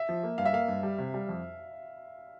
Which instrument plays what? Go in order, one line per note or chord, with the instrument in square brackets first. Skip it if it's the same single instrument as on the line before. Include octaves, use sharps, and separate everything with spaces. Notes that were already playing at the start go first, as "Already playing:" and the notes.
Already playing: [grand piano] E5
[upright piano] F3
A#3
[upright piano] G2 [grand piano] F5
[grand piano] E5
[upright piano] A#3 [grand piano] F5
[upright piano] G2
G3
C3
G3
F2